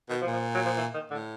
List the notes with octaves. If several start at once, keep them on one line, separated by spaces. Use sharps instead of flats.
B2 D#3
F3
A#2
F3
F#3
F3
E3
D#3
A2 D3